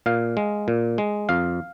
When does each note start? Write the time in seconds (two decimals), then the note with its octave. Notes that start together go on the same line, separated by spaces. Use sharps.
0.06 A#2 F5
0.37 G#3
0.68 A#2
0.98 G#3
1.29 F2 F5